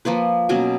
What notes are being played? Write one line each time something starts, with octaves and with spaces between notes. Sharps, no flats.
F3 A#3 F4 B4
B2 F#3 A#3 C#4